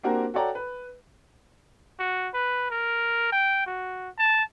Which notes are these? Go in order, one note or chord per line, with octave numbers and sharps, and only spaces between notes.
A#3 C4 D4 F#4 G4 A#4
F#4 A4 C#5 D5 G5 A#5
B4
F#4
B4
A#4
G5
F#4
A5